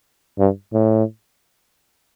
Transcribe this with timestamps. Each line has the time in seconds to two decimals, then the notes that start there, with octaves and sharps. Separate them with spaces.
0.39 G2
0.73 A2